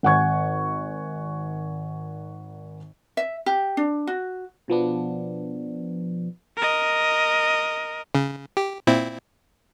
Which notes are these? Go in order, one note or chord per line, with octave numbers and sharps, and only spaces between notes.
G#1 F#5 G#5 C#6 G#6
E5
G4
D4
F#4
B2 F3 B3 D4
A#4 D#5
C#3
G4
A#2 C4 E4